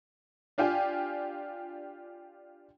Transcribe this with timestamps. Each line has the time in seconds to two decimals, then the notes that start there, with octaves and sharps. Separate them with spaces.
0.58 D4 F4 G4 G5 G#5